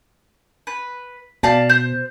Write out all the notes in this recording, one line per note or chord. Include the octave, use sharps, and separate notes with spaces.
B4
B2 D5 F5 A5
C5